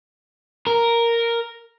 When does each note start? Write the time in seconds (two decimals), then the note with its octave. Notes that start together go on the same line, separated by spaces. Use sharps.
0.67 A#4